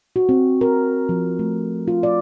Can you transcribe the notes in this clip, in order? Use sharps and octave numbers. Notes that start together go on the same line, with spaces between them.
F#4
C4
A#4
F3
A3
F4
D5